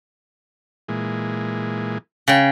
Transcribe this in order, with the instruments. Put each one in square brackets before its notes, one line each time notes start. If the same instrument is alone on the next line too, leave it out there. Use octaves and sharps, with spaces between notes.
[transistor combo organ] A#2 E3 G#3
[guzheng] C#3 G5